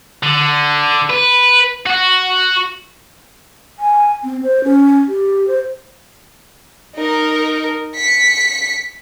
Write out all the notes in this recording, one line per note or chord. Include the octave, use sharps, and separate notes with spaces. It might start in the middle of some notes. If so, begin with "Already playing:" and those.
D3
B4
F#4
G#5
C4
C5
C#4
G4
C5
D#4 A#4
B6 C#7